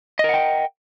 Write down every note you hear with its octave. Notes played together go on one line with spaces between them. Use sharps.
A#4 D#5 F#5 G5